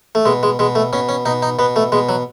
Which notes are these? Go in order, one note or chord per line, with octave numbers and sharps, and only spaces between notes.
A3
B2 G#3
G#3
B2 G#3
A3
B2 C#4
C#4
B2 D#4
D#4
B2 B3
A3
B2 G#3
F#3